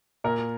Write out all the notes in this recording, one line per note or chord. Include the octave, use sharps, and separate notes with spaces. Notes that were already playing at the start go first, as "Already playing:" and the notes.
A#2 A#4